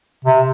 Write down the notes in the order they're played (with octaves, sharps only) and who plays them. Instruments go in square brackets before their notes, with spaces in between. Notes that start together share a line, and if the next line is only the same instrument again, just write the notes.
[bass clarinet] C3